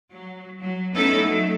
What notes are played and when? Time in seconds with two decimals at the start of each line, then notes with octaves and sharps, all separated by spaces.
0.12 F#3
0.60 F#3
0.94 A3 B3 C#4 D#4 E4 A4
1.24 F#3 A3